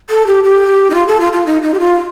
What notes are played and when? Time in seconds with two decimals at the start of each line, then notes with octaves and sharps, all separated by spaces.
0.10 A4
0.27 G4
0.44 G4
0.90 D#4
0.94 F4
1.07 A4
1.20 F4
1.33 F4
1.46 D#4
1.62 D#4
1.74 G4
1.79 F4